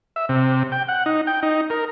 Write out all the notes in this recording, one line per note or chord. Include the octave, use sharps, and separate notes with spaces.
E5
C3
G5
F#5
D#4
G5
D#4
A#4